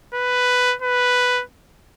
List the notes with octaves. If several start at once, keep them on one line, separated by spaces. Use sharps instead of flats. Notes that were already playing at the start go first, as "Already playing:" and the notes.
B4
B4